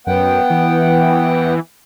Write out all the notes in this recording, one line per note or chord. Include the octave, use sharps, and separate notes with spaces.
F#2 B3 F#5 G5
E3